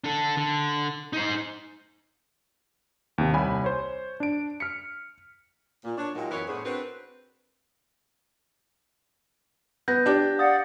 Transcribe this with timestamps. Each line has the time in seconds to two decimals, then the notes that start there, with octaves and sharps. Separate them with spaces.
0.04 D4 A4
0.37 D3
1.13 D#4 C5
3.18 D#2 C3
3.33 C2 C#5 G#5 B5
3.64 C5 C#5
4.20 D4 D7
4.60 F6 B6 C#7
5.85 A#2
5.97 D4 C#5
6.15 A#2 F#3 G#3 A#3 D#4 G4
6.31 F#2 E3 B3 A#4 B4 C#5
6.47 A2 B3 D4 G#4 C5 C#5
6.65 C4 D4 F#4 A#4 B4
9.88 B3 G6 A#6
10.06 D4 G4
10.39 D5 F5 F#5 D#6 A6